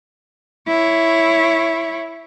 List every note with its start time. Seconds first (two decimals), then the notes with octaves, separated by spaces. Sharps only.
0.67 E4 C#5